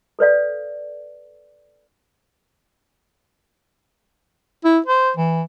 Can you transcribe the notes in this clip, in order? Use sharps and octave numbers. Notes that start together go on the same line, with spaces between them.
A4 B4 D5 F5
E4
C5
E3